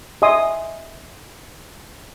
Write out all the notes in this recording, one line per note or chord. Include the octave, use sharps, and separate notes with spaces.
D#5 E5 G#5 C6 D#6